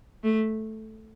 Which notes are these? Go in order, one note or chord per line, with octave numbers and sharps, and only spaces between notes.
A3